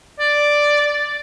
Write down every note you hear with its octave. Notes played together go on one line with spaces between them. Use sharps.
D5